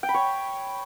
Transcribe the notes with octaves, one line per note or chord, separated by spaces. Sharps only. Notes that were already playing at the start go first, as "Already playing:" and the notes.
G5
B5
C#5